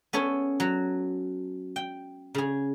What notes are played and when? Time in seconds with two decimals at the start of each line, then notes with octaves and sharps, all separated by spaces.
0.13 B3 C#4 A4 C#5
0.60 F#3
1.76 G5
2.35 C#3 G#4